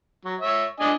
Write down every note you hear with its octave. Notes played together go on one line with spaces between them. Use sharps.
F#3
C#5 E5
D4 D#5 G#5